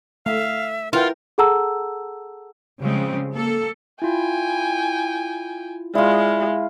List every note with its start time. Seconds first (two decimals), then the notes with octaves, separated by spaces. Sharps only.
0.26 A3 E5 F5
0.93 E4 F4 A#4 B4 F#5 G5
1.38 G#4 A4 F#5 A5 A#5 E6
2.83 C#3 F3 G3 G#3 C4
3.34 A#3 A4
4.02 E4 F4 G5 G#5
5.95 G#3 E4 F4 D5